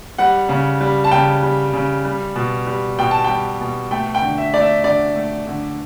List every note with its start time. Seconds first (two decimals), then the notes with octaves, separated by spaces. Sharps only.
0.18 G3 F#5
0.49 C#3
0.81 G3
1.04 A5
1.11 C#3 G5
1.42 G3
1.74 C#3
2.05 G3
2.36 B2
2.67 G3
2.98 B2 G5
3.11 A5
3.24 G3 G5
3.61 B2
3.91 A3 G5
4.15 G5
4.22 D3
4.38 E5
4.53 A3 D5
4.61 E5
4.84 D3 D5
5.16 A3
5.47 D3